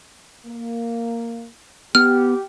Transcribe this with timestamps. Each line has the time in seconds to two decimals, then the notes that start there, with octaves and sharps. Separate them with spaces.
0.46 A#3
1.95 B3 G4 F6